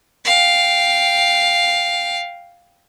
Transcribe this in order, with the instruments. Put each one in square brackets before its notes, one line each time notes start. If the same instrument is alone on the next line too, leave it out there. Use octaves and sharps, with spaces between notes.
[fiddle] F5 G5